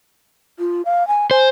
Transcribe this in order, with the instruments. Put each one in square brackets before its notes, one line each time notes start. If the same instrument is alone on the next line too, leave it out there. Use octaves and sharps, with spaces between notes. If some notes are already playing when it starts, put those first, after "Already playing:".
[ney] F4
F5
G#5
[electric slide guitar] C5 [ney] G#5